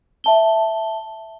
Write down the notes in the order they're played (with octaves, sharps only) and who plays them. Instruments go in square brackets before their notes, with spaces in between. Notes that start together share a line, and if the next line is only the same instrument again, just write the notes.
[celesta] E5 A5 G7